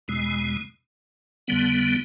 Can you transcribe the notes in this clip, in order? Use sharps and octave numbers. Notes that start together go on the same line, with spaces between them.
E2 B2 G#3
F2 D3 G3 B3